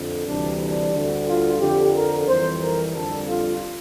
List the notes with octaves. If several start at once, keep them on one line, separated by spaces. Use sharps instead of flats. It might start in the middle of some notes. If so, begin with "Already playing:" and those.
Already playing: F2 D3
D2 C3 E3 G3 D4
D4
D2 D3 G3
F4
F2 D3 F3 G4
A#4
F2 E3 G3 C5
A#4
F2 D3 G3 A4
F4